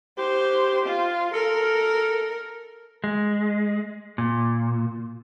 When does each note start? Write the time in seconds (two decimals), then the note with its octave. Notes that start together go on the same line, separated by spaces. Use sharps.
0.18 G4 C5
0.86 F4
1.34 A4 A#4
3.04 G#3
4.18 A#2